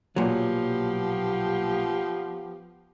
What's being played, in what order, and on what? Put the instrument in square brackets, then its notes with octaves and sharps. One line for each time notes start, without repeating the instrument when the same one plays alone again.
[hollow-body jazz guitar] B1 A#2 F#3 [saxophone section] F3 B3 G4